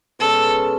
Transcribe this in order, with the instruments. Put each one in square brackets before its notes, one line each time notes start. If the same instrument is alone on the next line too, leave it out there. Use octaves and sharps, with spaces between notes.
[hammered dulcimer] B2 G#3 C#4 [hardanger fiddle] A4